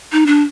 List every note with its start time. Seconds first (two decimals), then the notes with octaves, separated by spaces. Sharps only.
0.12 D#4
0.27 D4